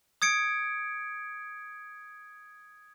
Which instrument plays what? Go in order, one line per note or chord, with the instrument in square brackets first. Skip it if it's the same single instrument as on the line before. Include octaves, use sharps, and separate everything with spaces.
[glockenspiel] D#6 G#6 C#7 D7